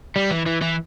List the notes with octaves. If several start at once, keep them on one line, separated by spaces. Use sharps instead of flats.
G3
E3
E3
E3